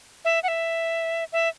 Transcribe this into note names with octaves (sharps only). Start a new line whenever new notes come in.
E5
F#5
E5
E5